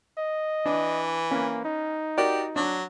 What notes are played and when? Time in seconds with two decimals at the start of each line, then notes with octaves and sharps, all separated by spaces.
0.18 D#5
0.66 E3 D4
1.31 A#3 C#4 B4
1.65 D#4
2.18 F#4 G4 A#4 D5
2.56 F#3 D4